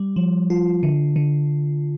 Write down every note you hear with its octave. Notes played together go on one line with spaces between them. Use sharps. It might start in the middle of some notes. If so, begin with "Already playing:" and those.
Already playing: G3
F3
F4
D3
D3